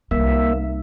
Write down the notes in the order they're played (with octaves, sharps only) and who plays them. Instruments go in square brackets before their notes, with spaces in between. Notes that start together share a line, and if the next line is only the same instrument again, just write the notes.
[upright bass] C2 D#4 [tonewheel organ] A#3 E5